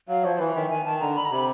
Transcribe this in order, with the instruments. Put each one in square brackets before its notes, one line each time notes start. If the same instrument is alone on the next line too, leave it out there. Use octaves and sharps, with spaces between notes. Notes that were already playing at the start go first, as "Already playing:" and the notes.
[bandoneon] F#3 [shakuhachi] F5
[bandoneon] F3 [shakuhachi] C#5
[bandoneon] E3 [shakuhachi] B4
[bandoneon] D#3 [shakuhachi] E5
[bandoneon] D#3 [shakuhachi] G#5
[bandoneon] D#3 [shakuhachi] A5
[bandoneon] D3 [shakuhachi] A#5
[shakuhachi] B5
A#5
[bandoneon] C3 [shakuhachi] B5